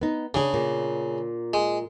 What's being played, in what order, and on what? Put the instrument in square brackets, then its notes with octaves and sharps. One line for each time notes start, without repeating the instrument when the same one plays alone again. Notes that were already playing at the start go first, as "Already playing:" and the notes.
[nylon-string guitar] B3 D#4
[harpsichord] C#3 [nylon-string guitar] D4 G#4
[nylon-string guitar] A#2
[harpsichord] G#3